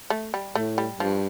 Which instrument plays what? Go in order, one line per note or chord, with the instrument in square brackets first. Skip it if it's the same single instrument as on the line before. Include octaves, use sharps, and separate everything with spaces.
[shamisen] A3
G3
[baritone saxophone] A2 [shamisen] A3
[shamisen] G3
[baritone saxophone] G2 [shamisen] F3